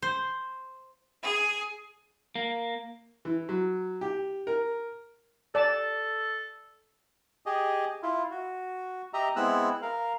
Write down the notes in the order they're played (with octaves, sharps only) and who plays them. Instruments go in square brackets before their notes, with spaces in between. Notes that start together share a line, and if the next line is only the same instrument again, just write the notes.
[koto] C5
[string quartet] G#4
[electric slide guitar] A#3
[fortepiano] E3
F#3
G4
A#4
[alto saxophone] A4 [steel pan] D5 A5
[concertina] G4 G#4 D#5
E4 F4
F#4
G4 D#5 E5 A#5
G#3 B3 C4 E4 E6 F#6
A#4 F5